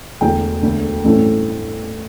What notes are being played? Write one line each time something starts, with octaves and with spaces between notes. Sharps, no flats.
E1 E2 D3 A3 G5
E1 D2 D3 A3
A1 G2 E3 A3 C4